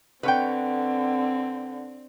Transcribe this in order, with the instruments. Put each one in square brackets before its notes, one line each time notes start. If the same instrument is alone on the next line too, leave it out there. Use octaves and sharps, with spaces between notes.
[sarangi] D3 [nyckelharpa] C4 [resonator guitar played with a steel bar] B4 C#5 G5